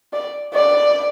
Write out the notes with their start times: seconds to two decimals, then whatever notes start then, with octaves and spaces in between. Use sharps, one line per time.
0.13 D5
0.54 D5